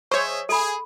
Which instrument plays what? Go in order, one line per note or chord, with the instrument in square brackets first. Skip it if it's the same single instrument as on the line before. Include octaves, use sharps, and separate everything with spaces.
[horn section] G#4 D#5 E5 [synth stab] C5 C#5 [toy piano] C#6
[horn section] G#4 [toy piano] A4 B5